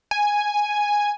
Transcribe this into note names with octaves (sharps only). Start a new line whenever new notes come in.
G#5